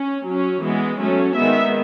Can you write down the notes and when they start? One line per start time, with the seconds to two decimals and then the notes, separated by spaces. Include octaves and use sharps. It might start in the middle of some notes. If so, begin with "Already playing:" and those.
Already playing: C#4
0.27 F#3 C#4
0.63 E3 G#3 B3
0.99 F#3 A3 C#4
1.36 D#3 G#3 B3 E5